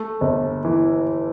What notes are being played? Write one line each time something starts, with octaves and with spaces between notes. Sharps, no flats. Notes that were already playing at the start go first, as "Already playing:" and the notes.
Already playing: A3
G1
E3